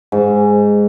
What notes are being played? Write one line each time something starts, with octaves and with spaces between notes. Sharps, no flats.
G#2